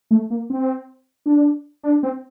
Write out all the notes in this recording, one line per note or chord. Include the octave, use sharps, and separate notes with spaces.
A3
A#3
C4
D4
D4
C4